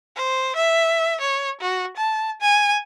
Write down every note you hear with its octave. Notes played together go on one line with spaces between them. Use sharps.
C5
E5
C#5
F#4
A5
G#5